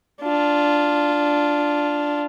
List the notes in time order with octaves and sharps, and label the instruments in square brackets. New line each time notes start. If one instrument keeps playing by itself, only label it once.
[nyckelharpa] D4 F4